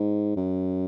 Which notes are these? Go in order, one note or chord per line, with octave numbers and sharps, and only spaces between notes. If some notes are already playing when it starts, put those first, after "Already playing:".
Already playing: G#2
F#2